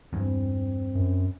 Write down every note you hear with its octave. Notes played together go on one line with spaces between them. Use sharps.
E2 G2 C4
F#2